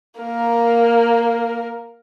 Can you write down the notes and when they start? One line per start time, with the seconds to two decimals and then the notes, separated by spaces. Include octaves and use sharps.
0.20 A#3 A#4